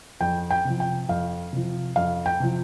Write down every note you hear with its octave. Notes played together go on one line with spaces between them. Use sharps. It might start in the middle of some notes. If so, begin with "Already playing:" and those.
F2 G5
G5
C3 F3
G5
F2 F5
C3 F3
F2 F5
G5
C3 F3